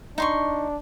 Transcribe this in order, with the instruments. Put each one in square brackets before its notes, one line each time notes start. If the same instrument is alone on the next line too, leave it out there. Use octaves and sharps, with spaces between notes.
[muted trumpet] D4 [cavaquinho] D#4 C6 C#6